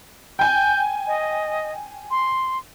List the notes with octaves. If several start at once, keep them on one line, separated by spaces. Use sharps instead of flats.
G5 G#5 G6
D#5
C6